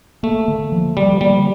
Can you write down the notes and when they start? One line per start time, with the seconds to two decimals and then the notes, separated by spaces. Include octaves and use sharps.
0.23 A3 A#3
0.48 D3
0.72 F3
0.97 D3 G3
1.21 G3 A#3